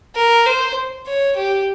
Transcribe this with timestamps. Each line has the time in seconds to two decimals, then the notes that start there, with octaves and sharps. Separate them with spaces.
0.16 A#4
0.46 C5
1.07 C#5
1.36 G4